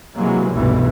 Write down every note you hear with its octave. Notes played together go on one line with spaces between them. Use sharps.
C3 E3 F#3 G#3 A#3
F1 C2 G2 B2 E3